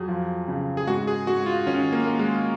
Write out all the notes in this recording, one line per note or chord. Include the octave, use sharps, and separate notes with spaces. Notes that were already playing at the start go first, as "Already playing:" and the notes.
Already playing: F2 F#3 G#4
F3
C#3
G#4
G#2 F#4
G#4
G#2 F#4
F4
D#3 C#4
A#3
A#3
G#3